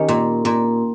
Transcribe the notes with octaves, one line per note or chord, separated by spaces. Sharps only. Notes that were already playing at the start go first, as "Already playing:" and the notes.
Already playing: D#3 C#4 G4 C#5
A#2
A#2